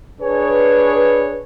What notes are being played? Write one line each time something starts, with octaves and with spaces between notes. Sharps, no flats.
D4 G#4 B4 C#5